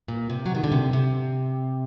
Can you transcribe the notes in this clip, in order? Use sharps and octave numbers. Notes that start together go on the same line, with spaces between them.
A#2
C3
F#3
D#3
D3
C3
C3